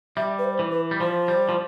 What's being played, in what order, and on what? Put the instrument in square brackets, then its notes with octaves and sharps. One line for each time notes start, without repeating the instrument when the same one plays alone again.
[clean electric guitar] G3 [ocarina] E5
[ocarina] B4
C5
[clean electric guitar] E3
[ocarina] B4
[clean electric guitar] G3
[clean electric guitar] F3 [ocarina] C5
[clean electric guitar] G3
F3